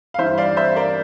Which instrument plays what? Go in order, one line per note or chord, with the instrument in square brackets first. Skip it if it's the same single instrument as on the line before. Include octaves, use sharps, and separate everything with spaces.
[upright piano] F5
G2 E3 C5 E5
D5 F5
C5 E5
A#4 D5